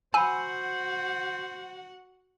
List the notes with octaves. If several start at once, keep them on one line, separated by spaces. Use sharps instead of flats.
F#4 C5 F#5 G#5 B5 E6